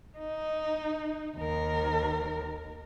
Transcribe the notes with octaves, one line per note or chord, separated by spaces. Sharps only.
D#4
D#2 A#4